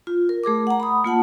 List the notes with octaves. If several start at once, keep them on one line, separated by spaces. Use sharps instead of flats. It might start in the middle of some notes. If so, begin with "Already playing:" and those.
F4
A#4
A3 G#4 A#4 D6
F#5 A#5
B5 D#6
A#3 F4 F#5 A5